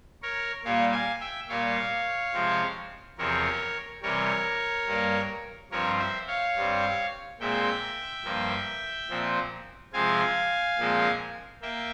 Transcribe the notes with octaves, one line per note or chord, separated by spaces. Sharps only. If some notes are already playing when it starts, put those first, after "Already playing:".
A#4 C#5
A#2 G3 A#3 C#5 F5
F5 G#5
E5 G5
A#2 G3 A#3 C#5 F5
C3 F3 G#3 C4
E2 C3 F3 C4 A#4 C#5
C3 E3 G3 A#4 C#5
G2 G3 A#3
G2 F3 C4 A#4 C#5
C5 E5
C#5 F5
G2 G3 C4
A#2 G#3 C4 E5 G5
G2 F3 A#3
A#2 F3 C4
C3 F3 G#3 C4 F5 G#5
A#2 F3 G#3 C4
A#3 E5 G5